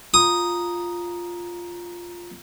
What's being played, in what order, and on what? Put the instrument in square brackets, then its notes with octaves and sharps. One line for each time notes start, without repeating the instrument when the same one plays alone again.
[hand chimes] F4 A#5 [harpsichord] D#6